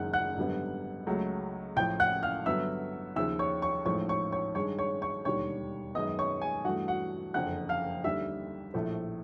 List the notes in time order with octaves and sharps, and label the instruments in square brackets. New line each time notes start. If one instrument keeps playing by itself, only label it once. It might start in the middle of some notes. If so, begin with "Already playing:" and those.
Already playing: [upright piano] F#1 F#2 D#3 G#3 F#5 F#6
F#5 F#6
G#1 F#2 D3 G3 B3
C#2 C#3 F#3 A3
A1 A2 F3 G5 G6
F#5 F#6
F5 F6
G2 D3 F#3 B3 E5 E6
D#2 C#3 F3 E5 E6
C#5 C#6
C#5 C#6
A1 G#2 F3 A3 C#5 C#6
C#5 C#6
C#5 C#6
G2 D#3 G#3 C#5 C#6
C#5 C#6
C#5 C#6
E1 D#2 D3 G3 C#5 C#6
F#2 D#3 G#3 B3 D#5 D#6
C#5 C#6
G#4 G#5
G2 E3 A3 F#4 F#5
F#4 F#5
F#1 F2 D3 F#5 F#6
F5 F6
D#2 D3 G3 E5 E6
A#1 A2 F3 A3